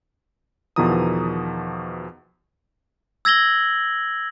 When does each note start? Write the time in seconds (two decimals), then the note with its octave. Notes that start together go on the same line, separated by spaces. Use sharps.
0.76 E2 B2 D#3 F3 A#5 D#6
3.25 E6 G#6 A#6 F#7 G7